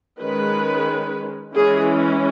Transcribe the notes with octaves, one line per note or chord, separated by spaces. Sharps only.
D#3 G#3 C#4 B4
E3 G#3 C#4 G#4